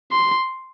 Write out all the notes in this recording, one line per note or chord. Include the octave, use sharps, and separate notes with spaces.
C6